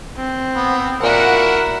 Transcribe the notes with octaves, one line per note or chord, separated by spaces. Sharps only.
C4
B3
A#2 E4 F#4 A#4 F#5